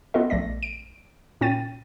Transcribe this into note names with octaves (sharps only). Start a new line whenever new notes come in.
B3 F4 A4 D#5
A#1 A3 D5 A#6
D7
A#2 C#4 G5 A6 D#7